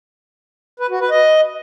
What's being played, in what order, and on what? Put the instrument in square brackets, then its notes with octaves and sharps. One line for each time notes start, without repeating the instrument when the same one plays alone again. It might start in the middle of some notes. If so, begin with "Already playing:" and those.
[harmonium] B4
F#4
B4
D#5